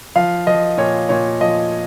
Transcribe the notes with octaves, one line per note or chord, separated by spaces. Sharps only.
F3 F5
F3 D#5
A#2 C#5
A#2 C#5
F3 D#5